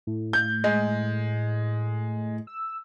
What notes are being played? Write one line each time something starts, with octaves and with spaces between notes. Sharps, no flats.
A2
G6
G#3
E6